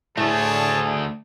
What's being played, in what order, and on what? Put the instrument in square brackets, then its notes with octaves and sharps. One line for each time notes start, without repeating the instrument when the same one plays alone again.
[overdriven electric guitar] D2 A3 [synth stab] A2 [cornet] G#4 [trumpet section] C#5 A5